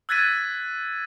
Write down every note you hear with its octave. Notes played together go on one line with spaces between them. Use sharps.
E6 F#6 G#6 A6 B6 D#7